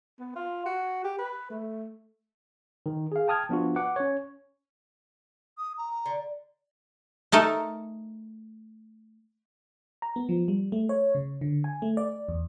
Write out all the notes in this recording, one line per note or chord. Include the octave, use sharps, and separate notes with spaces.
B3
F4
F#4
G4
B4
A3
D#3
G#4 F5
G5 A5 D#6 F6 G#6
F3 B3 D4 F4 F#4
B4 F#5 D6
C#4 C#5
D#6
A#5
D3
A3 D#4 A4 A#4
A#5
B3
F3
G3
A3
C#5
C#3
D3
G#5
A3
D5
E2